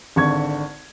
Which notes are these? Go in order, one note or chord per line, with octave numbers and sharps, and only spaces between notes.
G#1 D3 C#6 G#6